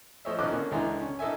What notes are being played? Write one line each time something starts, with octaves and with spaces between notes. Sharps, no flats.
F3 A3 C5 C#5 D#5 E5
A1 F4 D#5 A5 D6 F#6
D3 A#3 C#4
C#2 D3 E3 G#4 A#5 C6
C#4
A1 A4 D#5 E5 G#5